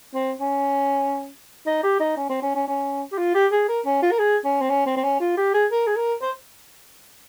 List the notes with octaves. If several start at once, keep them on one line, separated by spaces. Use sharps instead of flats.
C4
C#4
D#4
G4
D#4
C#4
C4
C#4
C#4
C#4
G4
F4
G4
G#4
A#4
C#4
F4
A#4
G#4
C#4
C4
C#4
C4
C4
C#4
F4
G4
G#4
A#4
G#4
A#4
C5